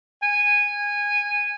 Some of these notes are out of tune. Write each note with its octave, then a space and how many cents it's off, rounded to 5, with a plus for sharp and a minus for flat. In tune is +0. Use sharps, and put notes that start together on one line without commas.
G#5 -15